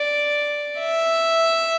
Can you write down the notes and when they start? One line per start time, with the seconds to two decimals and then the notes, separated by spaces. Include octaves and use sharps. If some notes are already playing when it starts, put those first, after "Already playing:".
Already playing: D5
0.79 E5